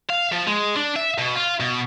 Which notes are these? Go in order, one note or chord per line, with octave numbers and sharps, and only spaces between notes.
F5
F3
G#3
D4
E5
B2
F4
B2